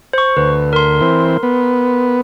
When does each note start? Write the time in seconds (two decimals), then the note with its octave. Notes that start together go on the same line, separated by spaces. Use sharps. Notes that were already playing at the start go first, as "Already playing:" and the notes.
0.13 C5 C#6
0.37 D2 B4
0.73 A#4 C6
1.01 E3 C4
1.43 B3